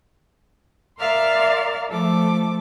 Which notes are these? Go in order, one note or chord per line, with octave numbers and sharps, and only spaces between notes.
A#4 D5 E5 F5 C6 F6
F3 A3 A4 D6